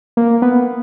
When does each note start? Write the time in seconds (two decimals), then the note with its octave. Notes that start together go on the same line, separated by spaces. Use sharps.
0.17 A#3
0.42 B3